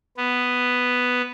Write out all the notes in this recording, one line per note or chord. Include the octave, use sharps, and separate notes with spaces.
B3